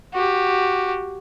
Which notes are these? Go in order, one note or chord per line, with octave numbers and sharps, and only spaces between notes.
F#4 G4